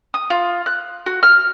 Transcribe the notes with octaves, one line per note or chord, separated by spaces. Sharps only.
D#6
F4
F#6
F#4
F6